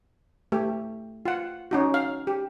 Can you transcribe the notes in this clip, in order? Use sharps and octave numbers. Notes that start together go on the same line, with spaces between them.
A3 G4
F4 F#5
C#4 D#4 F#4
F5
G4